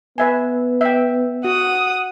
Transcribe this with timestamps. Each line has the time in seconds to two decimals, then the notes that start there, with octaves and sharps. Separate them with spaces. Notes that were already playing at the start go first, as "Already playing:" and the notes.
0.18 B3 B4 E5 G#5
0.81 E5 G5
1.45 F#4 F#5 D#6